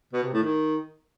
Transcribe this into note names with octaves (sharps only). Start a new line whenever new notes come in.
B2
C3
A2
D#3